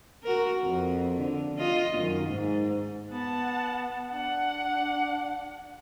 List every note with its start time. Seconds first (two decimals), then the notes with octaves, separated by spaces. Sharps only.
0.23 F#4 A#4
0.64 F2
1.18 D3
1.57 F4 D#5
1.98 F#2 D#3
2.27 G#2
3.11 B3 F#5 A5
4.12 D4 F#5